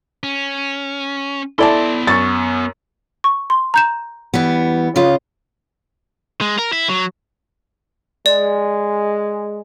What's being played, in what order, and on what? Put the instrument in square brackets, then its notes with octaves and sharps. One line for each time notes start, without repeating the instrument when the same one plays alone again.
[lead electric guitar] C#4
[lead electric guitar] B3 C6 [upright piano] E4 [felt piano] A4 D5 A5
[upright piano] F#2 C#6 [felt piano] A6
[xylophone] C#6
C6
A#5 G6 E7
[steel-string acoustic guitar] E3 G3 B3
C#3 F4 D#5
[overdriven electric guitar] G#3
A#4
E4
F#3
[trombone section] G#3 [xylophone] D5